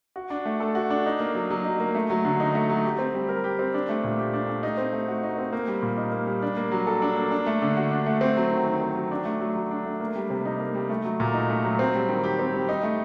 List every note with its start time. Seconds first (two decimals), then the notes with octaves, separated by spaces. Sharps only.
0.16 F#4
0.30 D4
0.45 A3
0.60 A4
0.75 F#4
0.90 D4
1.06 D#4
1.20 A#3
1.35 F#3
1.50 F#3
1.64 D#4
1.80 A#3
1.95 A3
2.10 F#3
2.25 D3
2.40 D#4
2.55 A3
2.70 F#3
2.84 G4
2.99 C4
3.14 G3
3.29 A#4
3.44 G4
3.59 C4
3.74 D4
3.89 A3
4.04 A#2
4.19 G4
4.33 D4
4.48 A3
4.63 D#4
4.78 C4
4.93 A3
5.08 F#4
5.23 D#4
5.38 C4
5.53 A#3
5.68 G3
5.82 A#2
5.97 D#4
6.12 A#3
6.27 G3
6.42 D4
6.57 A#3
6.72 F#3
6.87 A4
7.02 D4
7.16 A#3
7.31 D4
7.46 A3
7.62 D3
7.77 F#4
7.91 D4
8.06 A3
8.21 C4
8.37 F#3
8.51 D#3
8.66 D#3
8.81 C4
8.96 F#3
9.11 D4
9.25 A3
9.40 F#3
9.55 F#3
9.71 D4
9.85 A3
10.00 A#3
10.15 G3
10.30 C3
10.45 D#4
10.60 A#3
10.74 G3
10.89 A3
11.04 F#3
11.20 A#2
11.34 D#4
11.49 A3
11.65 F#3
11.79 C4
11.94 G3
12.09 D#3
12.24 G4
12.39 C4
12.54 G3
12.69 D#4
12.83 A3